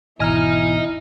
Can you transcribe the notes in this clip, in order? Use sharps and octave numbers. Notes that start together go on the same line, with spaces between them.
G#1 E2 B2 E4 D#5 G#5 A#5 F6